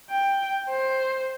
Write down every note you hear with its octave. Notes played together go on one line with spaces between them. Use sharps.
G5
C5